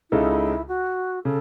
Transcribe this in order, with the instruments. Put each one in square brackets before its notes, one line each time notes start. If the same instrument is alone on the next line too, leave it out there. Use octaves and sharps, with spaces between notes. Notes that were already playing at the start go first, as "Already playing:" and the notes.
[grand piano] C#2 C#3 G#3 D#4 A4 [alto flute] E4
[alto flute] F#4
[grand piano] C#3 [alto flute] A4